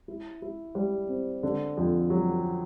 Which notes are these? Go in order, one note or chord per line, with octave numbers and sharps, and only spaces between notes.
E4
E4
G3
C4
D3
F2
F#3